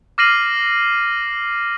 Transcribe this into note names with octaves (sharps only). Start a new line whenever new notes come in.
D6 F6 A#6 C7 D#7 F#7